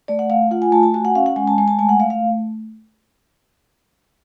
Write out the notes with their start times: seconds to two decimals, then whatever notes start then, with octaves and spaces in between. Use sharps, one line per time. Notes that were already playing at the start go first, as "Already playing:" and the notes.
0.08 A3 D5
0.19 F#5
0.30 A3 F5
0.51 F4 F#5
0.62 G#5
0.72 A3 A5
0.83 A5
0.94 F#4 G#5
1.05 F#5
1.15 C#4 F5
1.26 F#5
1.36 G#3 G#5
1.47 A5
1.58 G#3 G#5
1.68 A5
1.79 A3 G#5
1.89 F#5
2.00 A3 F5
2.10 F5